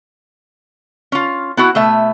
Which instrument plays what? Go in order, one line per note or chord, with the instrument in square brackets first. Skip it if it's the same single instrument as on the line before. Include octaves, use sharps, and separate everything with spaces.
[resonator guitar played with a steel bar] C#4 F4
B3 E4 F#4
B2 A3 E5